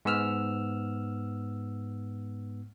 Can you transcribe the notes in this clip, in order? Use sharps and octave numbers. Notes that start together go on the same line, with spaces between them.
G#2 B3 E6 F6